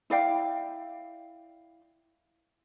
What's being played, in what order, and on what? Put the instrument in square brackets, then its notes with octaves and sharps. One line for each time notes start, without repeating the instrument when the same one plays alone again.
[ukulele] E4 D5 F5 G5